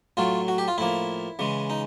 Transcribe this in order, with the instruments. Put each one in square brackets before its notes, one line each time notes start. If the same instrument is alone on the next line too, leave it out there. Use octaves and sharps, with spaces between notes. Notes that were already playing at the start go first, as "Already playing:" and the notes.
[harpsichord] A2 F#3 A3 F4
F#4
G4
F4
A2 F3 A#3 E4
C#3 E3 G#3
D#4